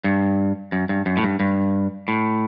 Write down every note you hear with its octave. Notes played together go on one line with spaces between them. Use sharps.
G2
F#2
G2
F#2
A2
G2
G2
A2